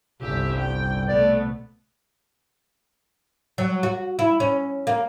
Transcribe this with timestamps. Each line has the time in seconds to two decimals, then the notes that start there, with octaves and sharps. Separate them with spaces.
0.21 G1 C2 G4 E5
0.59 G5
1.08 C2 B2 A3 B3 D5
3.58 F#3
3.83 F#4
4.19 E4
4.40 C#4
4.87 A#3